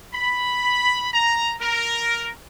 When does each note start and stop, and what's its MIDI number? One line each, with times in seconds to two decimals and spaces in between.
0.13 1.07 83
1.13 1.53 82
1.60 2.31 70